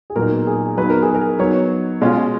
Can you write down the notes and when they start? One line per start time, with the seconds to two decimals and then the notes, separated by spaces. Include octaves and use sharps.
0.10 G#4
0.16 A#2 F#3 B3 D#4 A#4
0.47 G#4
0.77 F#3 B3 D#4 B4
0.90 A#4
1.02 G#4
1.15 A#4
1.39 F#3 B3 D#4 C#5
2.01 B2 G#3 C#4 F4